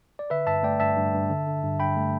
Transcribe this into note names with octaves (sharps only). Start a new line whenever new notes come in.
D5
D3 B4 E5
G2 E5 A5
A3 D5 G5
G2 E5 A5
G2
G2
D3
D3
G2
G2 G5 B5
A3